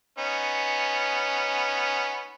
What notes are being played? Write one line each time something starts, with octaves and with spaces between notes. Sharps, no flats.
B3 C#4 D#4